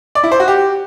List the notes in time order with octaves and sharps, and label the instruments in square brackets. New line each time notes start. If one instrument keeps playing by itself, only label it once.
[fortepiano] D5
E4
C5
F#4
G4